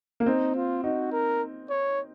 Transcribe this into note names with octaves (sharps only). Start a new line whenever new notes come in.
A#3
C4 D#4
F4
D#4 F#4
A#4
C#5